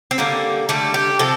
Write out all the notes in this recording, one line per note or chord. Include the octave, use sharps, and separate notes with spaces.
C4
D3 G3 A#3
D3 G3 A3
G4
C3 F3 A4